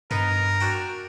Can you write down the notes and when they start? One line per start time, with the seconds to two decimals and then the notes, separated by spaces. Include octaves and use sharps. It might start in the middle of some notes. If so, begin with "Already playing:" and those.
0.11 G2 B3 D#4 A#4
0.60 D4 F#4 G5